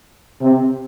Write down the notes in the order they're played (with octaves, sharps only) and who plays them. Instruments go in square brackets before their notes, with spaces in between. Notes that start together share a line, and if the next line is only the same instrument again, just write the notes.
[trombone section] C3